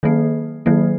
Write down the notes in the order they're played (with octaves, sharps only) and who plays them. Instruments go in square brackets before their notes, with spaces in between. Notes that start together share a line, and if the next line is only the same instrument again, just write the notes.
[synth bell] D#3 F#3 A#3
D#3 F#3 A#3